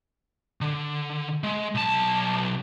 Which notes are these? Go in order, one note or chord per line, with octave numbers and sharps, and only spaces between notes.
D3
G#3
B1 A5